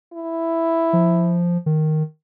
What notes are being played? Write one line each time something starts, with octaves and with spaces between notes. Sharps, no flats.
E4
F3
D#3